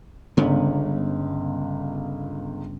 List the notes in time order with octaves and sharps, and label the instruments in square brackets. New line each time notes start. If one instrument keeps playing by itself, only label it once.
[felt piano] G1 C#2 [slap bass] G2 C#3 B3